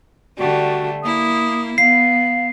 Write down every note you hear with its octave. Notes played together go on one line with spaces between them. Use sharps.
D3 G3 A3 F#4
A#3 E4 D#6
B3 F5 C7